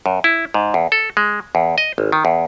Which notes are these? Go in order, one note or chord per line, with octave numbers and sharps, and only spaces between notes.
F#2
E4
G#2
E2
A4
G#3
E2
D#5
G#1
D#3
E2